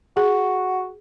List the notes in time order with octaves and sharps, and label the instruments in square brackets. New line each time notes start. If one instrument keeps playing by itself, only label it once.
[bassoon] F#4 [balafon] G#4